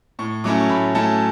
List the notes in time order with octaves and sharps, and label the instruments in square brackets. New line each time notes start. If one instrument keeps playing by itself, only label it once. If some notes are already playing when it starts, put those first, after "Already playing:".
[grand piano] A2 C#6
F#3 A3 C#4 E4 D6
C#6
A2 B5
F#3 A3 C#4 E4 A5